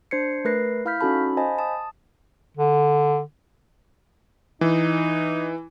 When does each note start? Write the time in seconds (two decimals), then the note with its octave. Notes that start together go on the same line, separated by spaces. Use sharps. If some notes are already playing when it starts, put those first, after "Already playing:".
0.11 D4 C5 G#6 C7 C#7
0.45 A3 A#4 B4 A#6 C7
0.85 E4 F5 B5 F6 G6 B6
1.01 C#4 D#4 F#4 A4 A5 B5
1.37 C5 D#5 F5 G#5 A5 B5
1.59 A5 D#6
2.57 D3
4.61 E3 D#4